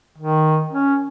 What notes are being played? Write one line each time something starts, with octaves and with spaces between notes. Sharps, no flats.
D#3
C#4